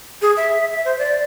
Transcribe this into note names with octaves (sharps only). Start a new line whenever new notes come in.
G#4
E5
E5
C5
D5